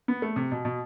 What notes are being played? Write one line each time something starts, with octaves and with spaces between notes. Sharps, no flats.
B3
A3
C3
B2
B2